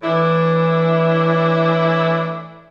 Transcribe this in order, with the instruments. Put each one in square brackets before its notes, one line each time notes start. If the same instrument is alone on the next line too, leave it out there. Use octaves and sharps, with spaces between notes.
[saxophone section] A2 D4 E4 [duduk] E3